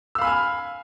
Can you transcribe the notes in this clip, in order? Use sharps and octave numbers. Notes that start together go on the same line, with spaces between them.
F5 G#5 B5 E6 F6